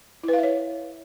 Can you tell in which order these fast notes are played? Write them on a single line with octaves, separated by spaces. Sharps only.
E4 B4 F5 E5 C#5